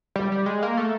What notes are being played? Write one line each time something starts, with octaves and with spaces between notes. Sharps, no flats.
G3
G3
G#3
A#3
A3